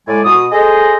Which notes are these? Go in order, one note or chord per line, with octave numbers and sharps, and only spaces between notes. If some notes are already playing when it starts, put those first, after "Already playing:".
A2 G#3 D5 G#5
B2 F#4 D#6
G#4 A4 C5 D#5